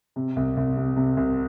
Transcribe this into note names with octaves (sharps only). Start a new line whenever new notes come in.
C3
C2
C2
C3
C3
C2